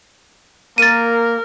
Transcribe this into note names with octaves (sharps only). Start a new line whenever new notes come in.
A#3 A#4 A6 D#7